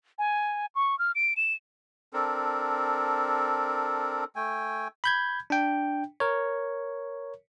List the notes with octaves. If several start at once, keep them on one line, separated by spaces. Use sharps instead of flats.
G#5
C#6
F6
D7
E7
C4 D4 A4 A#4
A3 G5 G#5
B5 G6 G#6
D4 G5
A#4 C#5